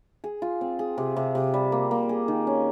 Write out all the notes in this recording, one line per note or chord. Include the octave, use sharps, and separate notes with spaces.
G#4
F4
C4
G#4
C3
C3
C3
G3
A#3
A#3
G#4
D#3
C#4